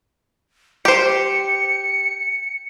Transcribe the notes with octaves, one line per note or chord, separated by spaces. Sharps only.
G4 C5 C#7